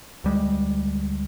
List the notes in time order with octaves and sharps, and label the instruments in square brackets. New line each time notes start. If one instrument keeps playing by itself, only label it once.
[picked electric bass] D2 G3 G#3